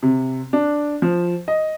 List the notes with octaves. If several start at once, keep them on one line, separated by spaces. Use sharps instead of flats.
C3
D4
F3
D#5